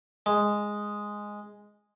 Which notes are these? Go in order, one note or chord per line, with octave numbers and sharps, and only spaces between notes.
G#3